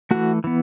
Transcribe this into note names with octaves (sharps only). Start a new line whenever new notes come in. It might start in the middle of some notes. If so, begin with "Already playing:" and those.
E3 A3 F#4
E3 B3